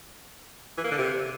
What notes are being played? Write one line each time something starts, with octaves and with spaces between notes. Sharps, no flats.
E3
A#3
D3
C3